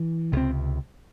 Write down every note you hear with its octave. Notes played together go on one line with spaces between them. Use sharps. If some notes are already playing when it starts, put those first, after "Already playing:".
Already playing: E3
C#2 C3 C4